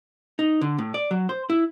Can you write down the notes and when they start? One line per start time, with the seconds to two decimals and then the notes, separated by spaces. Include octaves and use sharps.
0.39 D#4
0.61 D3
0.78 A2
0.94 D5
1.11 F#3
1.29 C5
1.50 E4